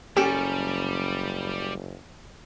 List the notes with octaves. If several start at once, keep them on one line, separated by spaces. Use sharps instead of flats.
F#1 G3 C#4 G4 A4 A#4